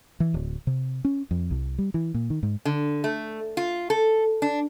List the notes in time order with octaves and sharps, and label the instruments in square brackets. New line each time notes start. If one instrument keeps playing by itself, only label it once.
[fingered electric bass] E3
D1
C3
C#4
F2
C2
G3
E3
A#2
D#3
G#2
[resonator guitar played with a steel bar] D3
A3
F4
A4
D4